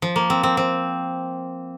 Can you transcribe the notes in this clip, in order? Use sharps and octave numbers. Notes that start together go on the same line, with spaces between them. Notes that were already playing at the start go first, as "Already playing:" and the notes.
F3
A#3
C4
C4
C4